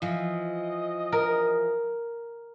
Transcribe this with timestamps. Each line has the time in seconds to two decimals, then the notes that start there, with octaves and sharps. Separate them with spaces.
0.02 E3 F3 D#5
1.12 A#4